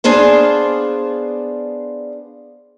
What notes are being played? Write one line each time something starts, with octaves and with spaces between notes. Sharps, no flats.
B3 D4 G#4 C5 F5